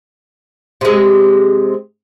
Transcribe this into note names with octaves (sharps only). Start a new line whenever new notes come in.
C3 G#3